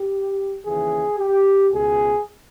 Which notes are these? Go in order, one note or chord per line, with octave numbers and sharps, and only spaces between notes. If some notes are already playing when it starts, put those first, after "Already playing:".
Already playing: G4
D#2 C#3 E3 G#4
G4
C#2 B2 G#4